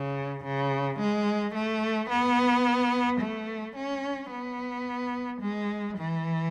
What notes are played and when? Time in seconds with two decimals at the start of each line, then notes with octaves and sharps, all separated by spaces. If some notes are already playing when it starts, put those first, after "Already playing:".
Already playing: C#3
0.44 C#3
0.99 G#3
1.54 A3
2.10 B3
3.21 A3
3.76 C#4
4.31 B3
5.41 G#3
5.97 E3